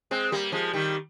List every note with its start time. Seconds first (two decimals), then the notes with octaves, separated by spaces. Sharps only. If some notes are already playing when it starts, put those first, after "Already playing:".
0.11 G#3 C4
0.32 G3 A#3
0.52 F3 G#3
0.73 D#3 G3